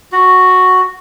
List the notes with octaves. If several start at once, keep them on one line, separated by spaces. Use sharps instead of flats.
F#4